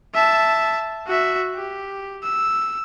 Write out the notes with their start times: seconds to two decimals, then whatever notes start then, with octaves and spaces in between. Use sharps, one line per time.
0.14 E5 A5
1.07 F#4 E5
1.55 G4
2.24 E6